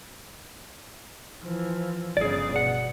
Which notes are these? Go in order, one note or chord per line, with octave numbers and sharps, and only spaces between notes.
E3 F3
G1 C#3 G#4 D5
B2 F#5